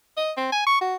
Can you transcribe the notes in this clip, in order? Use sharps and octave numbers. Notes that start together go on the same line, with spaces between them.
D#5
C4
G#5
C#6
F#4